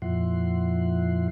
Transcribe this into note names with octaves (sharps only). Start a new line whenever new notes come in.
F2 A#2 F3 E4 F#5 C6